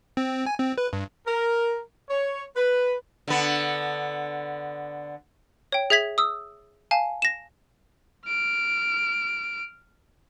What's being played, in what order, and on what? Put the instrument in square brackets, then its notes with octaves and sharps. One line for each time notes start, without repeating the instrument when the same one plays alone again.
[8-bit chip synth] C4
G#5
C4
B4
G2
[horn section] A#4
C#5
B4
[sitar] D3 B3
[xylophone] C#5 G5
G#4 E5 G#6 B6 F#7
D#6 E6
F5 G#5 A5
A#6 E7
[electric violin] F6 D7